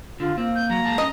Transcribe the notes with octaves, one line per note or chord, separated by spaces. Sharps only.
D3 F4
A#3 C4
G6
F#3 A#5
E2 G#3 A5
C#4 D#5